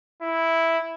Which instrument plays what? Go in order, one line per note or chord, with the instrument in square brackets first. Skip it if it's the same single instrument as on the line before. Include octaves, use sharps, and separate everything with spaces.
[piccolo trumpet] E4